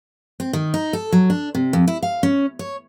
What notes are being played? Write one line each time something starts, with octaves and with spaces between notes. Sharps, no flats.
C4
D#3
D#4
A4
F#3
D4
C3
F2
E4
F5
C#4
C#5